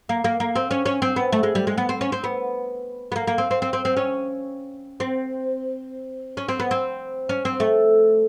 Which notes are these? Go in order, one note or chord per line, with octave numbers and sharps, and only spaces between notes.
A#3
A#3
A#3
C4
C#4
C#4
C4
B3
A3
G#3
G3
G#3
B3
C4
C#4
C4
B3
B3
A#3
A#3
C4
C4
C4
C4
C4
C#4
C4
C#4
C4
B3
C4
C#4
C4
A3